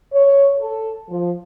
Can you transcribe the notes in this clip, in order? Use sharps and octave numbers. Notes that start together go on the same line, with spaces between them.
C#5
A4
F3